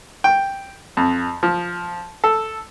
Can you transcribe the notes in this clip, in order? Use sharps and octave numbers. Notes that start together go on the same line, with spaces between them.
G5
F2
F3
A4